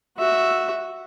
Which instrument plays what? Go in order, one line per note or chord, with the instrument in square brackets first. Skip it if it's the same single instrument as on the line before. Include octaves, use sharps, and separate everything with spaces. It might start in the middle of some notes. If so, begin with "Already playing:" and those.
[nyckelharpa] F#4 E5